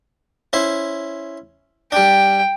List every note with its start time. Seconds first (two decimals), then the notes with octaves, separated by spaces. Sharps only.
0.53 C#4 E4 C5
1.92 G3 D4 G5